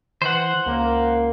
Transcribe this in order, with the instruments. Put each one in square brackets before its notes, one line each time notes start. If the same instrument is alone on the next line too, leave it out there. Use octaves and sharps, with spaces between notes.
[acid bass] E3 [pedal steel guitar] C5 F#5
[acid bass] C#2 [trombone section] A#3